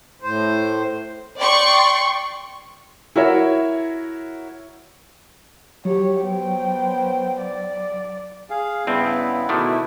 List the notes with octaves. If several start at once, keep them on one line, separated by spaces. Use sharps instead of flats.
A2 C5
D5 G5 C6 C#6
E4 F#4 A#4 C#5 E5
F#3 G4 C#5
B3 C5 C#5 G5
D5
G#4 F5
G2 C#3 B3 C4 E4
B2 D3 D#3 A3 E4